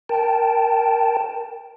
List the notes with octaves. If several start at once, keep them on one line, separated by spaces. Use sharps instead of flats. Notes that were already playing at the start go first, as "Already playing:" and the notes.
A#4 G5 A5